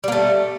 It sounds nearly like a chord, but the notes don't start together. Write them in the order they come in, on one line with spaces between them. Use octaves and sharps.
G3 A#3 A3